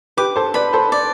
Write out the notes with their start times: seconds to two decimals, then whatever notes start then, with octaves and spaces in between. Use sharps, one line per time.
0.17 G4 B4 D6
0.36 A4 C5
0.54 B4 D5 B5
0.73 A4 C5
0.92 D5